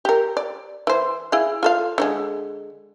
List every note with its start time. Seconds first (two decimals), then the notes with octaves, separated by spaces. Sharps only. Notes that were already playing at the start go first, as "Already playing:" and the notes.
0.05 G4 A#4
0.37 D5
0.87 E3 C5
1.32 E4 G#4 F5
1.63 F4 A4 F5
1.98 D3 F#3 G#3